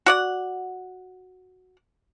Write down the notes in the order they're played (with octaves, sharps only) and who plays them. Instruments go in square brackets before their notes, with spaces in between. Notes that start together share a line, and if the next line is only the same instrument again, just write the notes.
[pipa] F#4 D5 F#5